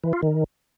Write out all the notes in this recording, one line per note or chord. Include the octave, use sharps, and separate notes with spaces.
E3
F4
D#3